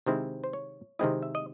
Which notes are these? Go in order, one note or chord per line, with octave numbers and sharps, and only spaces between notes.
C3 D#3 G#3 C4 E4 C5
C5
C#5
C3 D#3 G#3 C4 E4 D#5
E5
D#5